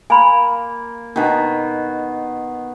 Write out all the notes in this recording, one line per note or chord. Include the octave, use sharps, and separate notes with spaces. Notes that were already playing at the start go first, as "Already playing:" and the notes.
A#3 G#5 B5 C6
B2 D#3 D4